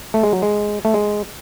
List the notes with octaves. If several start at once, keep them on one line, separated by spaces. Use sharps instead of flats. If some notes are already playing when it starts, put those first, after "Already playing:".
A3
G#3
F#3
G#3
A3
G#3